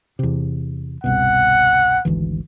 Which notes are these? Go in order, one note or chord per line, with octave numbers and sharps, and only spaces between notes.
E2 C3
G1 C2 B2 F#5
G#1 D2 E3